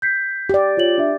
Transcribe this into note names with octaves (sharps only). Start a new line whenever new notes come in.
G6 B6 C7
G4 D5
F4 C#5 F#7
D4 E5